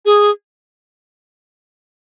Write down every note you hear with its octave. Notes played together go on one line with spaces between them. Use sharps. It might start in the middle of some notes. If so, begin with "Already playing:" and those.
G#4